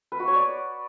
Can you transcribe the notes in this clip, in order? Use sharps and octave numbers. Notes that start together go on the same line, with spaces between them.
B4
F#4
C#5
D5